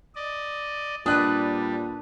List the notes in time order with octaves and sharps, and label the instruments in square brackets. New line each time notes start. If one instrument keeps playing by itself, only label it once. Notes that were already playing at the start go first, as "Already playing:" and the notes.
[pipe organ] D5 D#5
[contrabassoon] A#2 [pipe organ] G3 [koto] D4 B4 [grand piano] D#6 F#6